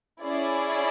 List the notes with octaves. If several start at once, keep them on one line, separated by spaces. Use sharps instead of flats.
C#4 E4 G#4 D5